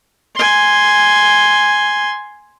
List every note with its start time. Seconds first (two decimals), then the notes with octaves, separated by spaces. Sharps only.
0.36 G#5 C6